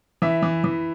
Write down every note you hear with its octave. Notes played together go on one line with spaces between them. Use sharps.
E3 E5
E3
E3